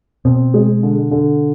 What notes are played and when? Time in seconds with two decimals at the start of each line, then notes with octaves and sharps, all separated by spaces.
0.25 B2 C4
0.54 G#3
0.83 D3
1.11 D3